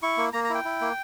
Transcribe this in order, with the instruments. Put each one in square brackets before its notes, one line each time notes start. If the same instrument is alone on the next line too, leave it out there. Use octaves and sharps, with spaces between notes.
[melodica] E4 C#6
A#3
A#3 A#5
A#5
E4 G5
E4
A#3